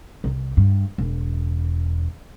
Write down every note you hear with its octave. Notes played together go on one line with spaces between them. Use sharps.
C2
G2
E1